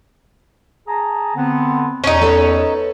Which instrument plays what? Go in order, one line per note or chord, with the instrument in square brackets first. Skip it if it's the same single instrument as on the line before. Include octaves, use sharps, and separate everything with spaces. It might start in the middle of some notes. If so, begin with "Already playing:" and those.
[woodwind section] G#4 A5 A#5
D3 B3 C4
[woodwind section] E2 [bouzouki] C#4 D#4
[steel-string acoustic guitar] A4 B4 C#5